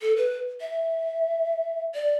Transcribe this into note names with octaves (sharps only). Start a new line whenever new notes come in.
A4
B4
E5
D5